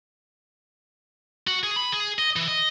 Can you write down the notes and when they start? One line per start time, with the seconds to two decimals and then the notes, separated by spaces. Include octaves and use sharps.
1.47 F#4
1.63 G#4
1.76 B5
1.92 G#4
2.19 D#5
2.36 E3
2.48 D#5